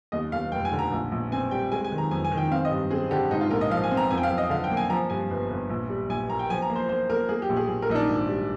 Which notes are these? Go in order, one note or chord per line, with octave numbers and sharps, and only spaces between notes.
D#2 D#5
D#2 F5
F1 G5
G#5
D3
A#5
A#1
A#1
C4 G#5
G3 G5
G#3 G#5
G#5
D#3
A#5
F2 G#5
G#5
D#3
G5
C4 F5
D#5
G2
C4 G#4
D3 G4
G#2 D#4
F4
A#1 A#4
D#5
F3 F5
G#5
C4
A#5
F2 G#5
G5
F5
F2
D#5
D3 F5
G5
A#3
G#5
F3 A#5
G2 G#5
G1
G1
A#1
G3
A#1 G#5
A#3 A#5
G5
F3 G#5
A#5
A#3
C5
A#3 C5
A#3 A#4
A#3 G#4
G4
A#1
G#4
A#1
A#4
A#1 D#4
D4
G#1
G3